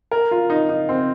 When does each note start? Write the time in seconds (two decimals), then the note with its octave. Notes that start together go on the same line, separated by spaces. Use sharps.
0.12 A#4
0.31 F4
0.50 D#4
0.69 D#4
0.89 C4